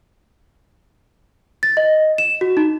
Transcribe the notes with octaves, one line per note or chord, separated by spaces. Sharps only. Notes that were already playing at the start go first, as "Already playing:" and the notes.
A6
D#5
E7
F#4
D#4